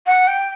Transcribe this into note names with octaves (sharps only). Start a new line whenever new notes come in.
F#5
G5